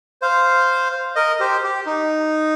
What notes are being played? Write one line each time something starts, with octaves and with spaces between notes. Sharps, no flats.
C5 F5
A#4 D#5
G4 C5
G4
D#4